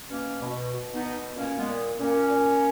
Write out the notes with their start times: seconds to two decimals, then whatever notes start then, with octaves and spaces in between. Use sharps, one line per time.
0.10 B2 A#3 C#4
0.42 B2
0.74 B2
0.94 B3 D#4
1.06 B2
1.36 A#2 A#3 C#4
1.58 G#3 B3
1.69 A#2
1.99 A#2 A#3 C#4
2.31 A#2